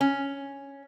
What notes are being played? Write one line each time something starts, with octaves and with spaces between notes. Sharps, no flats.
C#4